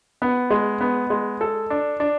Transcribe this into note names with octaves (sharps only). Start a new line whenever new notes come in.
B3
G#3
B3
G#3
A4
D4
D4